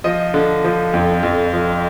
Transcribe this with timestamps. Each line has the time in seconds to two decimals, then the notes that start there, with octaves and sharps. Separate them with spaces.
0.04 F3 D#5
0.34 D3
0.64 F3
0.94 F2
1.23 F2
1.53 F3